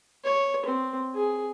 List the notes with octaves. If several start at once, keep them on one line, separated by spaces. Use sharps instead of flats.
C#5
C4
G#4